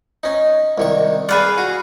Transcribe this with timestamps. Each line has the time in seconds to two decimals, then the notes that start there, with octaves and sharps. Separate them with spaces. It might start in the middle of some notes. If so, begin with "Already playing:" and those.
0.23 C#4 D#4
0.78 C2 D#3 C#6
1.29 G#4 B4 D5 F5
1.58 F#4